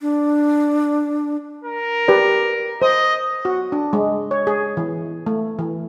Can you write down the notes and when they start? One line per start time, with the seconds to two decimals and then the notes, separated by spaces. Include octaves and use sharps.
0.01 D4
1.64 A#4
2.08 G4 B4 D5
2.82 C5 D#5
3.45 F#4
3.72 D4
3.93 G#3
4.31 C#5
4.47 G#4
4.77 E3
5.26 A3
5.59 E3